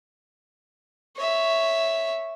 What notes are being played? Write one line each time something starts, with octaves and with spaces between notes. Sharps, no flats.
C#5 E5